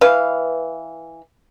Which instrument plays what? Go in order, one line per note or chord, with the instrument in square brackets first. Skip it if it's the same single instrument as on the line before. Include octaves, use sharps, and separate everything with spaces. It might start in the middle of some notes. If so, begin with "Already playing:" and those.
[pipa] E3 B4 F5